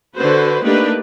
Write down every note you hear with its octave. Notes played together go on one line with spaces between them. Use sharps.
D3 F#4 B4 C5
A3 A#3 D4 D#4 G4 B4